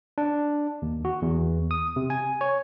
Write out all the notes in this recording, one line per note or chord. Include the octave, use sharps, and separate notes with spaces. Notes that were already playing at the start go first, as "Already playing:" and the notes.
D4
D#2
F#4
E2
D#6
C3
G#5
C#5